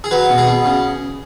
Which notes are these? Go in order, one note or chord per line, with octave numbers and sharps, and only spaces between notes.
G#4
F#3 B4
B2
G#4
B2
C#3